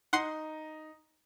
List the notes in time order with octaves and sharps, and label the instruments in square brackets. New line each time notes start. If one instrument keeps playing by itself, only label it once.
[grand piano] D#4 [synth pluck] F#5 C6